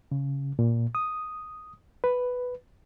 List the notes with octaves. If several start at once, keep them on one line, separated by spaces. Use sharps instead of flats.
C#3
A#2
D#6
B4